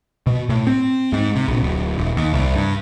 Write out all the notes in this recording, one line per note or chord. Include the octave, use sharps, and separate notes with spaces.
B2
A2
C4
G#2
C3
A#1
D1
D#1
D#2
C2
G2